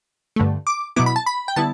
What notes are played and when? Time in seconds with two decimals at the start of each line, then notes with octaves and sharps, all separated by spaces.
0.36 G2 D3 A3
0.67 D6
0.96 B2 F#3 B3 E4 D6
1.06 B5
1.16 A5
1.26 B5
1.48 G5
1.56 D3 G3 B3 E4 A5